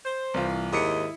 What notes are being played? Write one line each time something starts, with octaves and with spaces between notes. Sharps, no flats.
C5
C2 E3 F4
D#2 G#2 E4 D#5 C#7